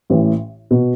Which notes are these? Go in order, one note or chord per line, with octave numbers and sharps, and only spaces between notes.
A1 A2 E3
B2